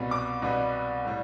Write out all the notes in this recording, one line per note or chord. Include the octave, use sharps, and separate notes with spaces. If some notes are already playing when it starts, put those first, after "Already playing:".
Already playing: C2 B2 G3 B3
D6
C2 B2 G3 B3
A2 G3